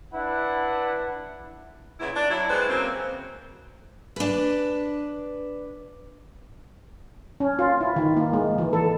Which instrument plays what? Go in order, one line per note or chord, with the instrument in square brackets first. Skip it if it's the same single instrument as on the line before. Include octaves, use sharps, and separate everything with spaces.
[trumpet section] D4 E4 B4 F#5
[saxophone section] A#2 C#3 B3 E4
D4
F#3 E4
G#3 B3 G4 G#4 B4 C5
C#3 F#3 A#3 C4
[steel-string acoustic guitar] D4 B4
[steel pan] C#4
F4
E4
D#3
A#3
G#3
E3
A4